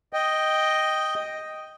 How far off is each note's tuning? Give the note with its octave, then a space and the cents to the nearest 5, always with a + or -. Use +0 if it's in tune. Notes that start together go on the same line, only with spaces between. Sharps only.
D#5 +0 G5 +0